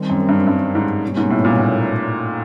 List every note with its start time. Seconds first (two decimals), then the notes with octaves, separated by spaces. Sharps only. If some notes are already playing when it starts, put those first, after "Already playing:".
Already playing: D#3 G3 C4
0.10 F#2
0.29 G2
0.47 G2
0.75 G#2
1.03 B2 G3 A#3 C#4
1.17 G#2
1.30 A2
1.45 A#2
1.59 A2